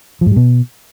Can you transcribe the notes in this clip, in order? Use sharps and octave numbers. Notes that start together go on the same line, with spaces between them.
F3
G#2
G3
B2